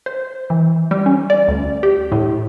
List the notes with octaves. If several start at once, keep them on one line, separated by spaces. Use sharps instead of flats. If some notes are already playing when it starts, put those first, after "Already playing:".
C5
E3
G3
C#4
D5
D2
G4
A2